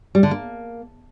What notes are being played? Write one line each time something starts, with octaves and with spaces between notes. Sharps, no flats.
G3
D3
A#3